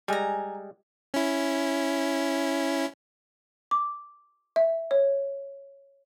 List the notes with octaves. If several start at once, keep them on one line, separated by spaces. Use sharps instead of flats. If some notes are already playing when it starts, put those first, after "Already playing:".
G3 G#3 G#5 A#5
C#4 E4
D6
E5
C#5